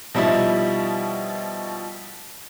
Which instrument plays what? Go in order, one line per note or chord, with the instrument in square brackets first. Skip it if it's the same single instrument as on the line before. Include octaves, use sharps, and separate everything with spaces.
[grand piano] B2 F3 G3 D#4 E4